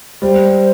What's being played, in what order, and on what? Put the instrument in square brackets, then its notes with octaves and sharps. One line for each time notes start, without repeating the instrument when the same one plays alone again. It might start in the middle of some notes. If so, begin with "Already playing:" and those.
[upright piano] G3 [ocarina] C5